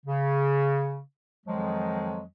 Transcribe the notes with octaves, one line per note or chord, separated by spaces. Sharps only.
C#3
F2 D#3 F3 F#3 G#3